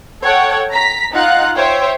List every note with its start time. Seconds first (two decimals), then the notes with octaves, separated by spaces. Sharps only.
0.23 A4 C#5 F#5 G5
0.71 A#5 B6
1.12 D#4 F4 F5 F#5 F#6
1.57 C5 C#5 E5 G5